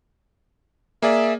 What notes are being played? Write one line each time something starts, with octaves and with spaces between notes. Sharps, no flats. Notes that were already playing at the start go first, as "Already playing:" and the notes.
A#3 G#4 D5 E5